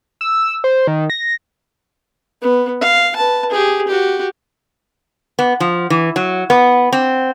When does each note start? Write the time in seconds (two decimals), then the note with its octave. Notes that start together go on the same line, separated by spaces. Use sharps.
0.21 E6
0.64 C5
0.87 D#3
1.10 A#6
2.42 B3
2.81 F5
3.16 B4 A5
3.50 G4 G#4
3.87 F#4 G4
5.39 B3
5.60 F3
5.90 E3
6.16 F#3
6.50 B3
6.92 C4